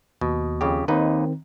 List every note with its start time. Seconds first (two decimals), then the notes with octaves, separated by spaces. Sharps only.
0.21 D#2 B2
0.61 F2 C#3 G4
0.88 D#2 D#3 C4 D#4 B4